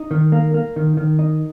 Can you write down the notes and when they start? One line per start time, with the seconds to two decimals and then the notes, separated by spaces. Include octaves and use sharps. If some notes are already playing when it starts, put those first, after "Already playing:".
Already playing: D#4
0.11 D#3
0.32 A#3
0.54 A#3
0.76 D#3
0.97 D#3
1.19 D#4